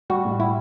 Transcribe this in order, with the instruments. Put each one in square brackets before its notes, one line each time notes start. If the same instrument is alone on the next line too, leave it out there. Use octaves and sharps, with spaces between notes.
[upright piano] G3 [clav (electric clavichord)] F#4
[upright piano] A2
[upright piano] G3 [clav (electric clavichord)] E4